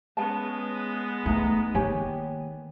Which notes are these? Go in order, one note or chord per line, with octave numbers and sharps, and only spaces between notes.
G#3 B3 C#4 A5
A3 D#4 A#5
D#3 A#3 G4 C#5 G#5